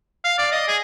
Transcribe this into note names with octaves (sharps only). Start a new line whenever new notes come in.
F5
D5
D#5
G#4